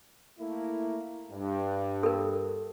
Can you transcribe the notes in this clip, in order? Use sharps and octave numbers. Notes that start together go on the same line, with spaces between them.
A3 A#3 E4
G2
A4 A#4